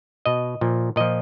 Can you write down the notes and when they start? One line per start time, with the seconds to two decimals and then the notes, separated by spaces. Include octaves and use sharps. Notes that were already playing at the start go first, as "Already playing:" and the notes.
0.26 B2 D#5
0.61 A#2 F3
0.96 A#2 F3 D#5